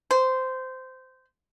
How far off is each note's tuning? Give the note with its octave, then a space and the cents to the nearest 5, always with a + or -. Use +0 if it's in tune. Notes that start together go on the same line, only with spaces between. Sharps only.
C5 -15